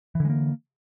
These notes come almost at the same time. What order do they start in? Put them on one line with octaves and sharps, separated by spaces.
E3 D3 G#3 A#3